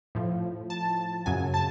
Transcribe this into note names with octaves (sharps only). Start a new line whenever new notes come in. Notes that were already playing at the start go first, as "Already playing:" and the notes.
A2 F3
A5
F#2 C#3 F#3 G#5
A5